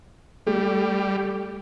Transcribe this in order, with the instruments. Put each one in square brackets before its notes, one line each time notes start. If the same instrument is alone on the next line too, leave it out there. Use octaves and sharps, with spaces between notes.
[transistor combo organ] G3 [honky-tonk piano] A3